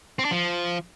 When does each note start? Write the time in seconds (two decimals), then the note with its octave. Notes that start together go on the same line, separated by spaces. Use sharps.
0.19 C4
0.25 D4
0.31 F3